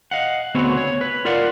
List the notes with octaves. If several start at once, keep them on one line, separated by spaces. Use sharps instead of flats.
D#5 F5 F#5
D2 B3 C4 F#4 G#4 C#5
C#5
B4
F4 A#4 D5 F5 F#5